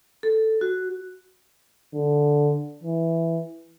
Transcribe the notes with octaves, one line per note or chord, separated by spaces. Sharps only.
A4
F#4
D3
E3